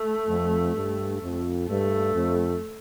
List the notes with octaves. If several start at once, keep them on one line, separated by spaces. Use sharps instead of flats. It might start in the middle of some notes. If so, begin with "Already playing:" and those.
Already playing: A3
F2
G2
F2
G2 A3
F2